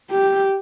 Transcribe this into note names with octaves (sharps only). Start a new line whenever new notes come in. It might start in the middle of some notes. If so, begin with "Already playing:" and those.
G4